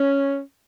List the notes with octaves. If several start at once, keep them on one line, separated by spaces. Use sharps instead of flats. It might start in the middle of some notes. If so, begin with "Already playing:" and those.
Already playing: C#4